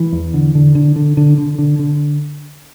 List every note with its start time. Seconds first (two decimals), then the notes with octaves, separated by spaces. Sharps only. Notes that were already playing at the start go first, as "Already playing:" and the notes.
Already playing: E3
0.12 E2
0.34 D3
0.55 D3
0.75 D3
0.96 D3
1.17 D3
1.38 D3
1.59 D3
1.79 D3